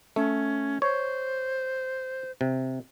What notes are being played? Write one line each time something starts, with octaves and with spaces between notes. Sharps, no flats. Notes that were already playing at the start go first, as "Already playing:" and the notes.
A3 C#4
C5 C#5
C3